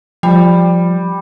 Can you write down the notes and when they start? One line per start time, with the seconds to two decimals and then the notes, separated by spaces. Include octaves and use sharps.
0.23 F3 G3